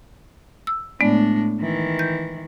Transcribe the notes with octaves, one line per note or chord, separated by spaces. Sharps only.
E6
A2 G#3 B3 D4 D5
D#3 E3
G6